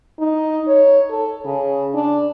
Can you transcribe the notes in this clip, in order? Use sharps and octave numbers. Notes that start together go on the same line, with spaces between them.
D#4
C#5
A4
C#3
D4